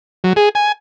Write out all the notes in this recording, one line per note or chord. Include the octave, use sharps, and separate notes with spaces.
F#3
G#4
G#5